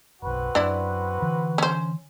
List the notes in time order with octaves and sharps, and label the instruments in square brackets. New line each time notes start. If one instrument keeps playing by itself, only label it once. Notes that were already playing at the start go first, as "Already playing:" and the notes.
[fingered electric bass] F#1 B1 [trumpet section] C4 F#4 B4
[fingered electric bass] F#2 [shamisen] D4 E4
[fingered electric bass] D3 E3
[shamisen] C#4 C5